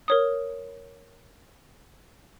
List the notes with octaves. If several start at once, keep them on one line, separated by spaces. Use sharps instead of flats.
A#4 C#5 D#6